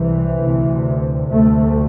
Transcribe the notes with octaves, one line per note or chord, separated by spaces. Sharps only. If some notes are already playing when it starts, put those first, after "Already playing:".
Already playing: C2 C3 E3
D2 C3
D2 C3 A3